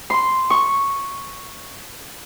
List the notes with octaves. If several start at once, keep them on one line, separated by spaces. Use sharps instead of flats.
C6
C#6